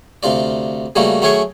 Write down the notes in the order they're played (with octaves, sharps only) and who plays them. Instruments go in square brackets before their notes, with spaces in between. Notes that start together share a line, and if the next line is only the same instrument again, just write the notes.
[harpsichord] D2 C3 F4 D5
C#3 G3 A3 A#3 F#4
F#3 A3 C#4 G#4 G5 C#6